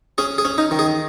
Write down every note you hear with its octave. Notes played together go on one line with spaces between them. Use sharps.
C#4 G#4
G#4
C#4
D#4
D#3
G#4